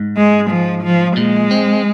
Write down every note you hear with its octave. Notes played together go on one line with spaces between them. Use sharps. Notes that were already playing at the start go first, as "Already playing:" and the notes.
Already playing: G#2
G#3
F3
F3
A#2 G#3
C4